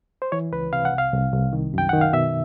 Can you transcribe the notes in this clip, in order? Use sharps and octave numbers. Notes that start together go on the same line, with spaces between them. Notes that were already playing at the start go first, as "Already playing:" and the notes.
C5
E3 C#5
C#2 B4
C3 F5
F#5
C2
F5
C2
C2
D#3
F#2 G5
D#3 F#5
F5
B2 E5